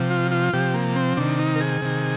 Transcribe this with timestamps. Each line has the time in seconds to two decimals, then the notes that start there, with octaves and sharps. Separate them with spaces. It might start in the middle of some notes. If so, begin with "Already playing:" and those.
Already playing: C3 F3
0.11 F4
0.31 F4
0.53 C3 F3 G4
0.74 A#3
0.96 C4
1.17 C3 D#3 D4
1.39 D#4
1.55 A#4
1.60 G#4
1.82 C3 D#3